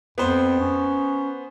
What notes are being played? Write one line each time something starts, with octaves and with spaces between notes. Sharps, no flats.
F2 B3 C5
C#4